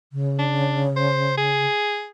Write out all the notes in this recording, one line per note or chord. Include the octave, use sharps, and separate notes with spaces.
C#3
D4
C5
G#4